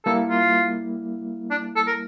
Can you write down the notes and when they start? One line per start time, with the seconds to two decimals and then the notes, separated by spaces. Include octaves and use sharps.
0.05 G3 A#3 E4 A4
0.29 F4
1.51 D4
1.76 A4
1.87 A#4